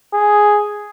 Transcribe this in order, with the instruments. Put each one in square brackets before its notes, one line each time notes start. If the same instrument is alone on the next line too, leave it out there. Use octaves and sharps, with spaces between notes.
[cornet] G#4